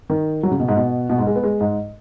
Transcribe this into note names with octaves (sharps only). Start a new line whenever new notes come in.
D#3
F#3
C#3
B2
G#2
B2
B2
G#2
G#3
B3
G#3
G#2